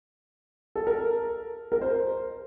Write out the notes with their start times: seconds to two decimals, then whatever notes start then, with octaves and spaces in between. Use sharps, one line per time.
0.76 A4
0.87 A#4
1.72 A#4
1.81 C5